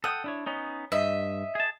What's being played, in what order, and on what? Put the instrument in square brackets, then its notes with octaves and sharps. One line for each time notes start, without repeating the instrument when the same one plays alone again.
[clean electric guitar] A4 F#5 G5 [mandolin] D#6
[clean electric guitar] D4 E4 C#5
B3 C#4 D#4
[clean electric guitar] G2 [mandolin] D#5 E5
[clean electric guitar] G#4 A5